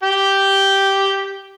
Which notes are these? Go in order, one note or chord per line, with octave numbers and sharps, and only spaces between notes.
G4 G5